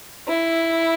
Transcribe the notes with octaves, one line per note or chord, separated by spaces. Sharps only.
E4